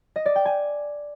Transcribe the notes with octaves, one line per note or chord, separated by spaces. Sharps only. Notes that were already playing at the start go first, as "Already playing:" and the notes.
D#5
D5
G5
G#5